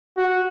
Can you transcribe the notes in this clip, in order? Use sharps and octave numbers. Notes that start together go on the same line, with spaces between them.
F#4